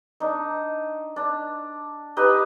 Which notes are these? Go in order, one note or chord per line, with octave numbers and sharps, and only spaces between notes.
D4 D#4
D4
D#4 G4 B4 D#5